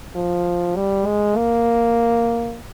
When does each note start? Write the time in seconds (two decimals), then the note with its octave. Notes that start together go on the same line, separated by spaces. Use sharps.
0.15 F3
0.76 G3
1.06 G#3
1.36 A#3